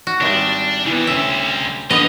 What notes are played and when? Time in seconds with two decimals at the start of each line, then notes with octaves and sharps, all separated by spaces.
0.07 F#4
0.21 G#1 G3 D4
0.86 C3 E3 G3 B3
1.07 D2 C#4 E5
1.90 B2 D3 F3 B3 D#5